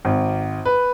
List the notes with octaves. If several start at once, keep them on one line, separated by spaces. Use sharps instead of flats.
G#1
B4